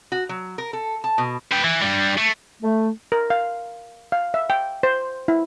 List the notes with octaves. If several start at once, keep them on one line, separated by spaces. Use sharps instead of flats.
F#4
F#3
A#4
A4
A5
B2
B4 G5
E3
G2 G3
A3
A3
A#4
F5
F5
E5
G5
C5
E4